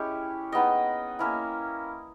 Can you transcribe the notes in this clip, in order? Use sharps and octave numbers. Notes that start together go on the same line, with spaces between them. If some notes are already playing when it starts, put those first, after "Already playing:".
Already playing: G#3 C#4 E4 G4 C#5
G#3 B3 D#4 D#5 G5
A#3 C#4 E4